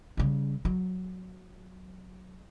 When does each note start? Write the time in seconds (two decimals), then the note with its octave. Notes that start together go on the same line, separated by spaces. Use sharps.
0.17 C#3 G3
0.65 F#3